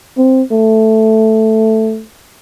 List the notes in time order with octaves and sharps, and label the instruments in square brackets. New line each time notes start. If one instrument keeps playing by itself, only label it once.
[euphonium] C4
A3